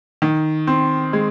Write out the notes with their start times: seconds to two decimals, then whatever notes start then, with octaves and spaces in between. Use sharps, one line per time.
0.22 D#3
0.67 C4
1.13 G#3